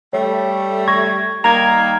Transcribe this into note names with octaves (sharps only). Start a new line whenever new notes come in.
G3 A3 C#5
C#6 G#6 A#6
D#3 G3 A#3 A#5 G#6 F7